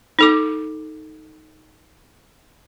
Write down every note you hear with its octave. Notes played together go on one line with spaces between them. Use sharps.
D#4 A4 D6